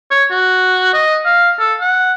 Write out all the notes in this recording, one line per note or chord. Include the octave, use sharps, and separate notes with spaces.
C#5
F#4
D#5
F5
A4
F#5